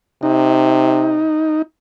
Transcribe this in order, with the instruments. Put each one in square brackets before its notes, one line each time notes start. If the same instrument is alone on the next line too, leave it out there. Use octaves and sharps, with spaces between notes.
[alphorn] C3 [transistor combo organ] D#4